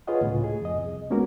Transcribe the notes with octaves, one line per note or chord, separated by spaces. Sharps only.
F4 G#4 B4 C#5 D#5 F#5
C#2 A2 C#3
G#4
F2 D#5
C2
G#3 A#3 B3 C#4 F#4 A#4